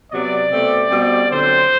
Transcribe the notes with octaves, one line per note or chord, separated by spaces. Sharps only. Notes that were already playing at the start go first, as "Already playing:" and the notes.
C3 F#3 B3 D5
B2 A3 C4
B2 G3 C4
D3 F#3 C4 C5